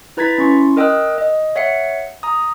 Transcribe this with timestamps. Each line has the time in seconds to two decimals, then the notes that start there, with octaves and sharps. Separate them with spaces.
0.17 E4 B4 A#5 G#6 A6 B6
0.38 C#4 E4 C6 C#6
0.77 A#4 D#5 G5 D#6 E6 F#6
1.18 D#5
1.56 C#5 E5 F#5 C7 C#7
2.23 A#5 D#6